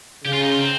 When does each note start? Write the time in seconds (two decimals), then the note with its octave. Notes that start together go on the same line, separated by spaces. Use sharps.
0.25 C#3 G4
0.33 F4
0.41 D#4
0.51 F4
0.59 C4